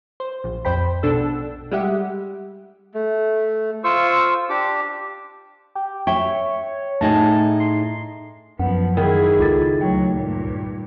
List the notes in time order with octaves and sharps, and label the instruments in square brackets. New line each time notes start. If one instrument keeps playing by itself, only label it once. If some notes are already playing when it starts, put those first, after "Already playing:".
[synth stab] C5
A#1
F2 C5 G5 B5
A#1 B2 D4 A4 E6
G3 G#3 G4 E5 F#5
[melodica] A3
F4 C5 C#6 E6
D4 G4 D6
[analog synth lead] G4
[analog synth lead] C#5 [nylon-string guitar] E5 G5
[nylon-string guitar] A2 D#4 G#4 [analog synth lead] A5
[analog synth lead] C6
[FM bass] F#2 [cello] F3 B3 [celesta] F#5
[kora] D#3 [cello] E4 G#4
[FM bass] C#2 [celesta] F4 A4 A6
[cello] D2 F#3 [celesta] G5
[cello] G2 A#2